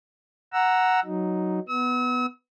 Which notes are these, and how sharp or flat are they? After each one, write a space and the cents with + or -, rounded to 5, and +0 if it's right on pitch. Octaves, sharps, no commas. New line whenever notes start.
F#5 +0 A#5 +0 E6 +5
F#3 +0 D#4 +0
B3 +5 E6 -45